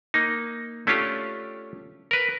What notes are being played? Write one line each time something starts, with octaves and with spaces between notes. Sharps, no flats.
A#3 D#4
A3 C#4 D4 F4 G4
A#4 B4